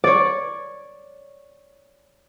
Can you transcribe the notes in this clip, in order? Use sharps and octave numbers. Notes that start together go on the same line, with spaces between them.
C#5 D5